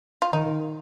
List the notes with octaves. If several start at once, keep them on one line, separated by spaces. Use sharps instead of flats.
F4
D#3 D#4